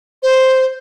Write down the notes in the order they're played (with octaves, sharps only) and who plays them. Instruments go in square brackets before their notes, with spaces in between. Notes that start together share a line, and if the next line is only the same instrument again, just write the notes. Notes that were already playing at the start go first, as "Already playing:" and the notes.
[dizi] C5